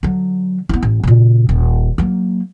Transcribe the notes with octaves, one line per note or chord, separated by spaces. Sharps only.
D3 F#3
B3 E4
A1
A#2 C#3
D#1
F#3 A#3